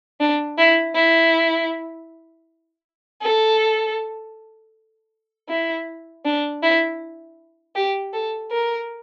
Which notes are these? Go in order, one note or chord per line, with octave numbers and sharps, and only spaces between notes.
D4
E4
E4
A4
E4
D4
E4
G4
A4
A#4